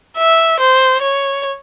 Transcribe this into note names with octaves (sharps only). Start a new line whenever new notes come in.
E5
C5
C#5